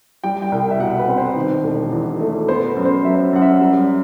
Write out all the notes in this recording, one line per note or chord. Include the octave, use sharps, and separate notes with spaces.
G3 G5
G5
C2
E5
B2 F#5
B4
C4
C5
D#3
E1
E2
A3
B3 C5
B4
F#2
C5
F#3 E5
F#2 F#5
E5
G3